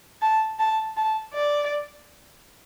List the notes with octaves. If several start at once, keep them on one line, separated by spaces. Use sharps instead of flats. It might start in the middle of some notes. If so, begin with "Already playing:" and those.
A5
A5
A5
D5